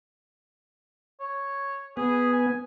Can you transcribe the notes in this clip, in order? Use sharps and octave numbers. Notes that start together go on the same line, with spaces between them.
C#5
B3 G#4
G#5